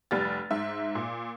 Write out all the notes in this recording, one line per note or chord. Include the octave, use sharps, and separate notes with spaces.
F1 G3 F6 A6
G#2 E5
A#2